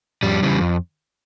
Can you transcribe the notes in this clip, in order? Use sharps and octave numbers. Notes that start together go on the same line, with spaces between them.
F2 G3
C#3 E3 G3
F2